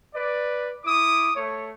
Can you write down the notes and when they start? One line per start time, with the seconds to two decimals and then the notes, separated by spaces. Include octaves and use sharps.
0.13 B4 D5
0.84 E4 D6 D#6
1.35 A3 C#5